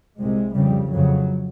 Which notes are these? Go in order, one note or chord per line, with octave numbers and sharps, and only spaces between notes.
C2 C3 G#3
F2 C#3 G3
F2 C#3 F#3